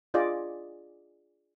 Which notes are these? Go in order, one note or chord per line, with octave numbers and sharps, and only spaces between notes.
D4 F4 G#4 D5 D#5